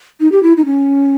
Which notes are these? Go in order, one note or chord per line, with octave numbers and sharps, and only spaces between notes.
D#4
G4
E4
D#4
C#4